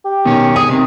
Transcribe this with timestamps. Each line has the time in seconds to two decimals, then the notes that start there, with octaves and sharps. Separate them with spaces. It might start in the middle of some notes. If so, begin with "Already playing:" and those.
0.05 G4
0.26 B2 D#3 C#4
0.56 G#4 D#6
0.69 C3 D#3